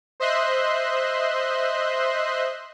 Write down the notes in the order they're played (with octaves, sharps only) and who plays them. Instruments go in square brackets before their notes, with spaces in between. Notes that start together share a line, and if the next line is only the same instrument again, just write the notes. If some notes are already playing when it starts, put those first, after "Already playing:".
[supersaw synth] C5 D#5 E5 C6 F#6